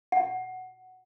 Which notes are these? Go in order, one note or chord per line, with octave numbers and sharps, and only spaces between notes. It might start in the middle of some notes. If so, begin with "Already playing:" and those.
F#5